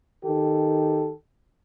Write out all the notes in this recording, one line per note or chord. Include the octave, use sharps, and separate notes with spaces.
D#3 G4 A4